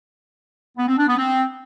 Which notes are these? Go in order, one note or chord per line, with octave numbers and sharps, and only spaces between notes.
B3
C4
D4
B3
C4